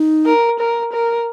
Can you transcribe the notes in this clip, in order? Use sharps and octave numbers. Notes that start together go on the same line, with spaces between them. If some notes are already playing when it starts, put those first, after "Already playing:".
Already playing: D#4
A#4
A#4
A#4